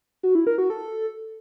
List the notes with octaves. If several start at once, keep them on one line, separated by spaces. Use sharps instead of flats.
F#4
E4
A#4
F#4
A4